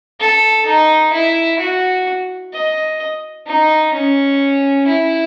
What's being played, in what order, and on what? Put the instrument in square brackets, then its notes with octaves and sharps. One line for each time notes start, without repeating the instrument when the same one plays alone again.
[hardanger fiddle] A4
D#4
E4
F#4
D#5
D#4
C#4
E4